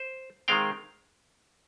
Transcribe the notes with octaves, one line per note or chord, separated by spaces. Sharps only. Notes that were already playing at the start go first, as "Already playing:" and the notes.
Already playing: C5
D#3 G#3 C4 F5 G5